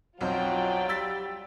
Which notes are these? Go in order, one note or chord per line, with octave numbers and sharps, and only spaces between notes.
B1 F2 F#3 C4 F4 D5 G5
G3 E6 A6 B6